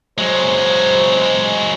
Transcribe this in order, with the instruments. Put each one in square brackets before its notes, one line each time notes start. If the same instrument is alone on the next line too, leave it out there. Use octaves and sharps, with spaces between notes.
[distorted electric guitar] F#3 G#3 [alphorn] C5